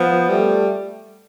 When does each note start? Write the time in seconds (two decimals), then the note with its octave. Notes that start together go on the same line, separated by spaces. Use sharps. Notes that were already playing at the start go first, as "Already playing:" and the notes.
Already playing: F3 B3
0.29 G3 A3